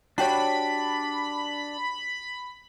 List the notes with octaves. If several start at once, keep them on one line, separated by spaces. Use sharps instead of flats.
D4 F#4 G4 C#5 B5